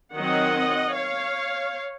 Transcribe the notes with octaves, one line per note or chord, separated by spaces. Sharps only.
D#3 F#3 C4 D#5 F#5
C#5 F5